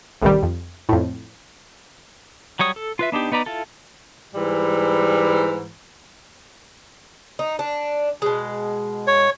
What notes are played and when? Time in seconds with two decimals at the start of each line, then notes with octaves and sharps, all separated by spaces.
0.22 A1 D#2 C3 D#3 G3
0.43 F2
0.89 F2 A2
2.59 F#3 G3 C#5 D#6
2.76 A4
2.99 F4 B4 E5
3.12 B3 D4 D#4 G4
3.32 B3 D#4 B4 D5 A#5
3.46 E4 F4 A4
4.35 G#2 E3 G3
7.39 D#4
7.59 D4
8.22 B2 G#3
9.07 C#5